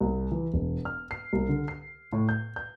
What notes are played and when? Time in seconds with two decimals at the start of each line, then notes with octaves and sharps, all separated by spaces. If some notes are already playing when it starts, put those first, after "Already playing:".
0.01 C2
0.32 E3
0.54 E1
0.85 F6
1.11 C7
1.33 C2
1.49 D3
1.68 C7
2.13 A2
2.29 G6
2.56 G6